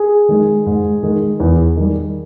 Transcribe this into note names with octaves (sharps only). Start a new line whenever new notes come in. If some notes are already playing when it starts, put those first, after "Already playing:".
Already playing: G#4
D#3 G#3
G#2
D#3 G#3
E2
D#3 G3